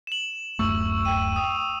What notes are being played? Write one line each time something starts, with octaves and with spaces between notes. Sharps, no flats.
E7 F#7
D1 F#2 A3 C#6 E6
G5 D#7
D#6